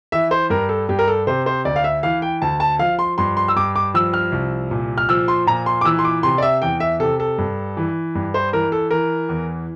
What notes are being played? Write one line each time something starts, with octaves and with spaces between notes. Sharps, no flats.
E3 E5
C5
G2 A#4
A4
G2 G4
A#4
A4
C3 C5
C5
D2 D5
F5
E5
E3 F5
G5
D2 A5
A5
F3 F5
C6
G2 C6
C6
E6
G2 D6
D6
F3 E6
F6
C2
A#2
F6
F3 E6
C6
A#2 A#5
C6
D6
E3 E6
C6
D6
C3 C6
D5
E5
E2 G5
E5
C3 A4
A4
G2
E3
G2
C5
E3 A#4
A4
E3 A#4
E2